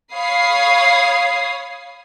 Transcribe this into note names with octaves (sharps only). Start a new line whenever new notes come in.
C#5 F5 B5 D#6 G#6 C7